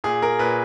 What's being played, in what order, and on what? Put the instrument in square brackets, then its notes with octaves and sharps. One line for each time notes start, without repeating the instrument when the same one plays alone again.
[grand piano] A#2 G#4
A#4
A#2 B4